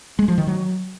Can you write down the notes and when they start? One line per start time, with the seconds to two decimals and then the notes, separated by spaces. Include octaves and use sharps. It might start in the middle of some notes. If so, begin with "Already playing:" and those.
0.19 G#3
0.28 F3
0.38 D#3
0.47 F#3